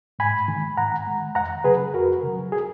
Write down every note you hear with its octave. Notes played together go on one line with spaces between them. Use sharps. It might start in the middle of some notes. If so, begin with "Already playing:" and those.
G#2 G#5 B5
D#3 G#3
G#2 F#5 A#5
D#3 G#3
F2 F#5 A#5
C#3 F#3 G#4 B4
F2 F#4 A#4
C#3 F#3
G#4